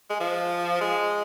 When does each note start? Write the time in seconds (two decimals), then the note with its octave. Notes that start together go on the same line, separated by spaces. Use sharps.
0.10 G#3
0.20 F3
0.81 G#3